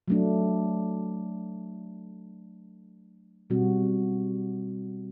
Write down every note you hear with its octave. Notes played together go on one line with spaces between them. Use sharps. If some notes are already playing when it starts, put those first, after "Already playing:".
F#3 A3 D4
B2 G3 C4 F#4